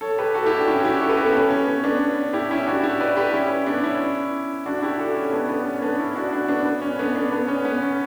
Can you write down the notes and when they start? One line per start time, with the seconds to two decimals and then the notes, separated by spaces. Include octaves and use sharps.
0.01 A4 C#5
0.19 G4 B4
0.35 F#4 A4
0.45 E4 G4
0.57 D4 F#4
0.67 C#4 E4
0.79 F#4
0.84 E4 G4
1.01 F#4 A4
1.09 G4 B4
1.17 F#4 A4
1.26 B3
1.34 C#4
1.50 C#4
1.67 B3
1.84 B3 D4
2.33 E4 G4
2.51 C#4 E4
2.67 D4 F#4
2.83 E4 G4
3.00 B4 D5
3.17 G4 B4
3.34 C#4 E4
3.66 B3 D4
3.83 C#4 E4
4.66 D4 F#4
4.83 E4 G4
4.99 F#4 A4
5.16 C#4
5.33 B3 D4
5.49 B3
5.65 C#4
5.82 B3 D4
5.99 C#4 E4
6.15 D4 F#4
6.32 D4 F#4
6.48 B3 D4
6.65 B3
6.82 C#4
6.99 B3 D4
7.15 B3 D4
7.32 B3
7.48 C#4
7.65 B3
7.82 C#4